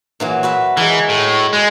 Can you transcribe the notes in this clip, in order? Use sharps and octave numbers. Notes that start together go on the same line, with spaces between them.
A#2 E3 F#3
F#4 B4 E5
E3 G#3 A#4
A2
G#3